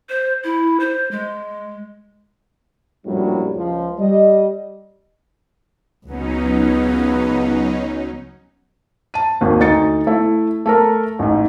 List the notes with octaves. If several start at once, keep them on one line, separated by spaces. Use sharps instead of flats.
C5
E4
C5
G#3
A#1 F#2 A2 F#3 G3
C#2 F3
G3 D#5
C#2 F#3 B3 C#4 D#4
A5 D#7
G#1 D#2
D2 D#4 A6 C#7
A3 E4
A3 A4 A#4
A1 G#2